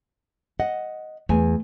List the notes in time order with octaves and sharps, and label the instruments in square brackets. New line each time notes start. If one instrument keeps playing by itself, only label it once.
[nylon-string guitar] D#5 F#5
[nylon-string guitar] E2 G#5 [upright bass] A3